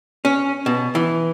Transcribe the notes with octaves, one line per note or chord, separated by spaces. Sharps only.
C#4
B2
E3